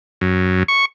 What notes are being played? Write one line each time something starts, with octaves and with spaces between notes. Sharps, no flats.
F#2
C#6